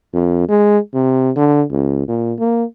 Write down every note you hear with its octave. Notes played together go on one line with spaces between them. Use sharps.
F2
G#3
C3
D3
C#2
A#2
A#3